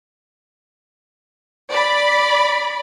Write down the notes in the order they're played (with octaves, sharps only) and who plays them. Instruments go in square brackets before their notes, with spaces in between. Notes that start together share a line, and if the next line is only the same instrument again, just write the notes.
[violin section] D5 B5